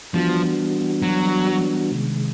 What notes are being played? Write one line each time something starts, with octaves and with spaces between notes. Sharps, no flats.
E3 F3 G3 B3 D4 F#4
F#3
C3 D#3 G#3